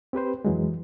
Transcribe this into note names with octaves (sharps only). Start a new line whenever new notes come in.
C4 G4 B4 C5
F2 E3 F#3 G#3